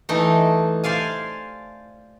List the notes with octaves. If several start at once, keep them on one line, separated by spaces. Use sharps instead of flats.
E3 A3 D#4
C5 D5 F5 G#5